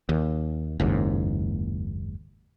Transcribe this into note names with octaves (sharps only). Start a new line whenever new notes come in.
D#2
F#1 D#2 G#2